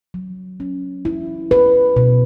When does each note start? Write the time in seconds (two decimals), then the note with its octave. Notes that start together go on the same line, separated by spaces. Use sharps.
0.14 F#3
0.60 C#4
1.05 E4
1.51 B4
1.96 B2